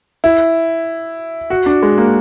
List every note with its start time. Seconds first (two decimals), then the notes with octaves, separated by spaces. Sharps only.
0.24 E4
1.50 F#4
1.66 D4
1.82 G#3
1.98 A#3